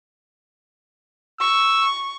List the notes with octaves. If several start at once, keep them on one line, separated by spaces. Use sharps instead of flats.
C#6 E6